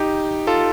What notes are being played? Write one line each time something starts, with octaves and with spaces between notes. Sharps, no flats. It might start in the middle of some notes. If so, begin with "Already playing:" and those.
Already playing: D#4 G4
F4 A4